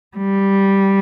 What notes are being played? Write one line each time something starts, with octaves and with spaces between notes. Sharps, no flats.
G3